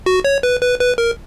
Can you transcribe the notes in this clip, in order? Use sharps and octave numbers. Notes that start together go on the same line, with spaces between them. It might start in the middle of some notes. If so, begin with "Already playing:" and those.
F#4
C#5
B4
B4
B4
A#4